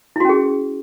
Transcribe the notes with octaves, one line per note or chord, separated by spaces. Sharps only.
C#4 E4 F#4 G#4